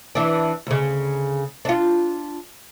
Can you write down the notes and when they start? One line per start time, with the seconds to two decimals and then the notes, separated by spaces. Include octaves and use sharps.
0.15 E3 D4
0.67 D2 C#3
1.65 D4 F4